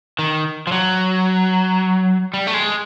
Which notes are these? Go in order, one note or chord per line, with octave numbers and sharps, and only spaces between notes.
D#3
F3
F#3
G3
A3
G#3